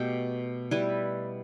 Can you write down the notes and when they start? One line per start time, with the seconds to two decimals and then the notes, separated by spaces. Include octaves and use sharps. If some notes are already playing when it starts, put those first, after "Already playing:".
Already playing: B2 A3 G4
0.71 G3 E4 B4